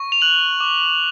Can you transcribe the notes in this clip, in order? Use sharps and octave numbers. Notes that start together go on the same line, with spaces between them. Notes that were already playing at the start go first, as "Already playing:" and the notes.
Already playing: C#6
F7
F#6 F#7
D6